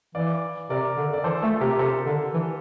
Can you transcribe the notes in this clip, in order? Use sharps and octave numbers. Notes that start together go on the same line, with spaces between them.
E3 D5 F5
C3 A#4 D5
D3
D5
E3 A4 C5
A3 F4 A4
C3 G4 A#4
C3 A4 C5
D3
E3